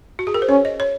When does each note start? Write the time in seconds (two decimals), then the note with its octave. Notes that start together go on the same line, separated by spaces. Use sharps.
0.19 F#4
0.27 G#4
0.34 A#4
0.42 C5
0.49 C#4 C#5
0.65 D#5
0.80 C#5